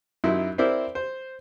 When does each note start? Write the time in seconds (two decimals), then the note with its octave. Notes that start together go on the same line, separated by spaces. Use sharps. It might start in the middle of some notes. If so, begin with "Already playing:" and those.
0.24 F#2 D#4 E4 C6
0.58 C4 E4 A#4 C5 D5 E5
0.95 C5